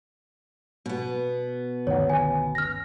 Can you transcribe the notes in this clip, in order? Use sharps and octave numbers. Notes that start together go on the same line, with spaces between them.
B2 B3
G1 D2 D#3 C#5 F#5
G#5
F6 A#6